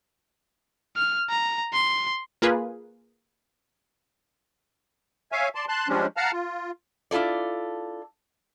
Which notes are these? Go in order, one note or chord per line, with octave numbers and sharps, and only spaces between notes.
F6
A#5
C6
A#3 F4 G#4 B4
C#5 E5 F5 G#5
D5 A5 C6
A5 C6 F#6
F3 G3 G#3 C#4 D4
F5 F#5 A5 A#5 F6
F4
D4 E4 F4 A4 D5